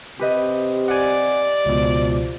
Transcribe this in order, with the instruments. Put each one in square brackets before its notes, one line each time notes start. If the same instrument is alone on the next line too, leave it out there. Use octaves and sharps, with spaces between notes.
[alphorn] C3 [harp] G4 B4 D#5
[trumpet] D5 [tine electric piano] F#5 G#5
[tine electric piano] C#2 B2 [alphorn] F3